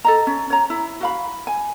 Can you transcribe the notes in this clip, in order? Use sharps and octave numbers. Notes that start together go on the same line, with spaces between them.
A4 D#5 A#5
C#4
C#5 A#5
E4
F#4 F5 B5
G#5